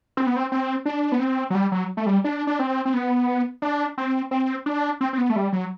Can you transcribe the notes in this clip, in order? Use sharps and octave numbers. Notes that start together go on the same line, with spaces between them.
C4
B3
C4
C4
D4
B3
C4
F#3
G3
F#3
A3
G3
D4
D4
C4
C4
B3
D4
C4
C4
D4
C4
C4
B3
A3
G3
F#3